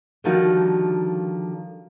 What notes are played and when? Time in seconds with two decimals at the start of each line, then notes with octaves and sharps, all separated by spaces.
0.24 D3 D#3 F3 G3 D#4 F#4